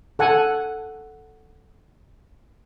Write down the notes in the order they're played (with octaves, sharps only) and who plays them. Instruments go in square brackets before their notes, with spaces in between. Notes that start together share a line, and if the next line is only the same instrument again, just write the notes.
[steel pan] A4 F#5 G#5